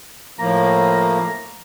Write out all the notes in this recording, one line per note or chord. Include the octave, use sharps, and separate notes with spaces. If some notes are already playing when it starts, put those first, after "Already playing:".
A2 F3 A#3 A#5